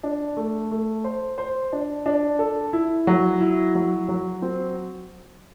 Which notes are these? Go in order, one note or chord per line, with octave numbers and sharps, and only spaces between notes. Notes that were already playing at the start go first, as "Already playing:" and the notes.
D4
A3
A3
C5
C5
D4
D4
A4
E4
F#3
E4
F#3
F#3
C4